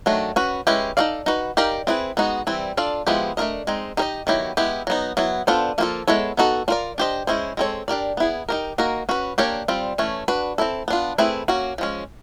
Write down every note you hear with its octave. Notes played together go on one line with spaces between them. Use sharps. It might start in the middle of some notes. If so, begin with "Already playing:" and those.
D#3 F#3 A3 D4
C#4 F#4 B4
G#3 C#4 E4 G4 B4
D#4 F#4 A4 D5 F5
D#4 F#4 B4
D#4 G4 A#4 D5 F5
C4 E4 G#4 B4
G#3 B3 D#4 F#4
E3 G3 C4 E4
D4 F4 A4 D5 F5
F3 G#3 B3 E4 G4
A3 D4 F4 A#4 D#5
G#3 C4 D#4
D#4 G4 A#4 D#5
D#3 F#3 B3 E4 G4
G#3 B3 E4 G4
F#3 B3 D#4
F#3 B3 E4
B3 D4 F4 A4 C5
F3 A#3 C#4 F4 A4
G#3 B3 E4 A4 C#5
B3 D#4 F#4 A4
D4 F4 A#4 D5
D4 G4 C5 D#5
G#3 C#4 E4 G#4 C5
G#3 C4 E4 A4 C#5
D4 G4 A#4 D5
B3 E4 G#4
D#4 G4 A#4
A#3 D#4 F#4 A#4
C#4 F#4 B4
A#3 D4 G4 A#4 C#5
G3 C4 F4
E3 A3 C#4
D4 F#4 B4
C4 E4 A4
B3 D4 F4
A3 C4 E4 G#4 B4
A#3 C#4 F#4
F3 G#3 C#4